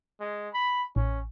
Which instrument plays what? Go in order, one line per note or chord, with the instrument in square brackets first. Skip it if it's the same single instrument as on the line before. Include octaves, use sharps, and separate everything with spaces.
[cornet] G#3
B5
[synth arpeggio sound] A1 [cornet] C#4